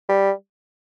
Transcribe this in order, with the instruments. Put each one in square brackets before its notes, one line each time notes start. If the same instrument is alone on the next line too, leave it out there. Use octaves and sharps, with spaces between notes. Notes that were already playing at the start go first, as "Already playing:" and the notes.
[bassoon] G3